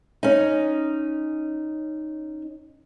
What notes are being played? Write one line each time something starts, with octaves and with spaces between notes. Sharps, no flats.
C#4 D#4